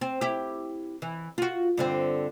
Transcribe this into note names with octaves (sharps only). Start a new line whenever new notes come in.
C4
E4 G4
E3
F4 F#4
G2 D3 C4